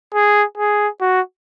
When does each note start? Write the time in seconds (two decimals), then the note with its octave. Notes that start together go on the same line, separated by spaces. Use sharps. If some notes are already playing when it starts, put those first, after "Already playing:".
0.14 G#4
0.58 G#4
1.01 F#4